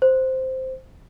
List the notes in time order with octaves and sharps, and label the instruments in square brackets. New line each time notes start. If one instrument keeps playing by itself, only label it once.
[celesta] C5